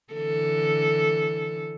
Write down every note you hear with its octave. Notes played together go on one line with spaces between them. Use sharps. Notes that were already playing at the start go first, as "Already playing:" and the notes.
D3 E3 A4